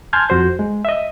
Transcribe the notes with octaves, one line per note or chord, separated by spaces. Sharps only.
G#5 A5 C6 F6 G6 G#6
F2 F#4 C5 G6
G#3
D#5 E5